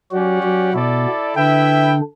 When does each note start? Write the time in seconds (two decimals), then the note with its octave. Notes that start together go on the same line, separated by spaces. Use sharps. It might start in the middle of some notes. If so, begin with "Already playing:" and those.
0.11 F#3 C#4 F#4 G4 D5 F#5
0.43 F#3 F#4
0.74 B2 B3 E4 A4 D5
1.36 D3 D4 E4 B4 E5 G5